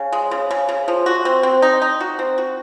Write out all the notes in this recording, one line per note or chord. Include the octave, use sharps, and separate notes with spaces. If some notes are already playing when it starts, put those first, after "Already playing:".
Already playing: C#3
G#3
C#3
C#3
C#3
F3
F#4
C4
C4
D#4
D#4
F#4
C4
F#4